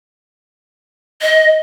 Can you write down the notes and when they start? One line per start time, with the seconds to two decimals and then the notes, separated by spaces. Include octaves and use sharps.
1.22 D#5